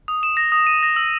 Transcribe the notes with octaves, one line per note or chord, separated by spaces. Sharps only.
D#6
E7
A#6
D#6
D#7
A#6
E6